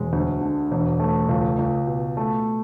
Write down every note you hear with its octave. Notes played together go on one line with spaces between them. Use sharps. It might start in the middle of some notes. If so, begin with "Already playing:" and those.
Already playing: E1 G#3
D2
D3
E1
A3
C#2
C#2
B2
A3